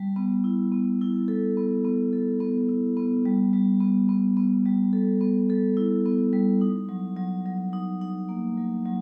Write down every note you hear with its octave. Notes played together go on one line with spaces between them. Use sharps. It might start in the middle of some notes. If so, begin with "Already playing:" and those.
Already playing: G3
B3
E4
B3
E4
A4
B3
B3
A4
B3
E4
B3
G3
G3
B3
B3
B3
G3
A4
B3
A4
E4
B3
G3
D#4
F#3
F#3
F#3
D#4
D#4
A#3
F#3
F#3